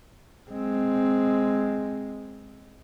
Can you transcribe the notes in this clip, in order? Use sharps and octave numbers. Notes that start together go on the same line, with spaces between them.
G#3 C4